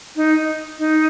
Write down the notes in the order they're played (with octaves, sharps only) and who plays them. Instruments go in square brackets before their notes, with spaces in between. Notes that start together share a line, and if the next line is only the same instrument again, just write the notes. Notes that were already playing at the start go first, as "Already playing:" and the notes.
[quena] D#4
D#4